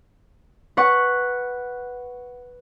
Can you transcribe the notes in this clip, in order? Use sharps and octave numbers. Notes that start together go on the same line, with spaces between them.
B4 F#5 C#6